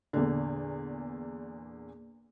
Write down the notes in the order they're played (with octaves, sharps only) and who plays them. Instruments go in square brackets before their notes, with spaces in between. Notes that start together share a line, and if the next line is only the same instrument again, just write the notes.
[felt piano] E2 A#2 D3